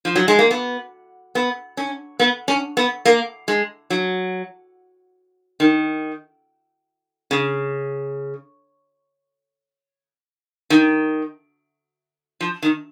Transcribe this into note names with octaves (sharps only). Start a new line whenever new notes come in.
F3
F#3
G#3
A#3
B3
B3
C#4
B3
C#4
B3
A#3
G#3
F#3
D#3
C#3
D#3
F3
D#3